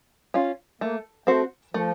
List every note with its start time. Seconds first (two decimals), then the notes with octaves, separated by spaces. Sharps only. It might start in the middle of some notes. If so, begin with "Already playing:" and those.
0.34 C#4 F4
0.81 A3 A#3
1.27 A3 C4 F#4 C5
1.74 F3 A3